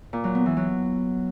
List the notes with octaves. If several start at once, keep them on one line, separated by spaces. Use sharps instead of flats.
A#2
F#3
B3
E3
F#3